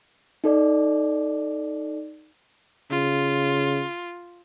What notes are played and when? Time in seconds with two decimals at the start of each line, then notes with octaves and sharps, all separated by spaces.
0.44 D#4 A4 D5
2.91 C#3 F4